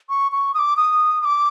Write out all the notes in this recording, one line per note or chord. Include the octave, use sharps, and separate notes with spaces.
C#6
C#6
D#6
D6
D#6
D#6
D6